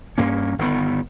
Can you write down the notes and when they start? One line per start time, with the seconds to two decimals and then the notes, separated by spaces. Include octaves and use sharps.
0.18 G2 A#3 C#4
0.59 G1 D#3 B3